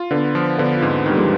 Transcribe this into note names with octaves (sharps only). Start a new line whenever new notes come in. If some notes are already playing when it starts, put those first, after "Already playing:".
Already playing: F4
D3 B3 D4
F3
D3 B3 D4
F4
G#2 C4 D#4
D#3 G3
F3 G#3